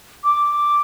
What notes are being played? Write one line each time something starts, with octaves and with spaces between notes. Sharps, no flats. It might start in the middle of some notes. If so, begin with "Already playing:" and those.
D6